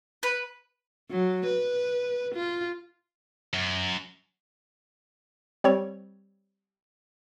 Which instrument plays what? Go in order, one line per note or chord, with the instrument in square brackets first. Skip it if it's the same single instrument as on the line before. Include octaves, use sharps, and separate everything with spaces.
[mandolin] B4
[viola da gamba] F#3
B4
F4
[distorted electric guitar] F#2
[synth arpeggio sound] G3 C4 C#5